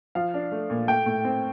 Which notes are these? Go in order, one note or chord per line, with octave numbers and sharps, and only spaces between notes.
F3 F5
D4
A3
A#2
A3 G5
A2
C4